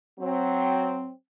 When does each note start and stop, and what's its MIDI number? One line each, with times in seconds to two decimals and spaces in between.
0.20 1.11 54
0.20 1.11 60